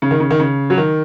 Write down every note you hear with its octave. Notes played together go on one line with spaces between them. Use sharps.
C#3
D#3
C#3
D#3
C#3
F#3
D#3